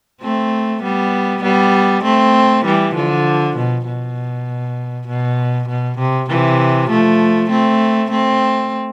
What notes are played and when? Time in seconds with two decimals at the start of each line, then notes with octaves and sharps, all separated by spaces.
0.22 A3 C4
0.82 G3 B3
1.43 G3 B3
2.04 A3 C4
2.65 E3 G3
2.95 D3 F3
3.56 B2
3.86 B2
5.07 B2
5.69 B2
5.98 C3
6.29 C3 E3
6.90 F3 A3
7.50 A3 C4
8.11 A3 C4